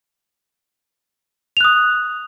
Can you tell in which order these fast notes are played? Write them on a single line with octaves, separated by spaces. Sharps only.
F7 F#6 D#6